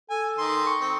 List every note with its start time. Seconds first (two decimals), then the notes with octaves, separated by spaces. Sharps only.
0.10 A4 G#5
0.38 D#3 C6
0.67 C#6
0.81 C4